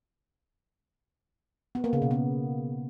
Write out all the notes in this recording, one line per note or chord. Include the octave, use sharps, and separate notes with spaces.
B3
A#3
C#3
B2
B3